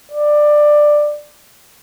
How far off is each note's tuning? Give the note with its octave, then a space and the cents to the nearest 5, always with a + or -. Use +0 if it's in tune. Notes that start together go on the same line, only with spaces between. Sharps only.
D5 +15